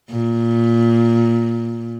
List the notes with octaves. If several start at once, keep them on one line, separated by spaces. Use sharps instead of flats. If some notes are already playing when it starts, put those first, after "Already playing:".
A#2